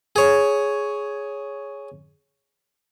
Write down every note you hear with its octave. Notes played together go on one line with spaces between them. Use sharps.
G#4 C#5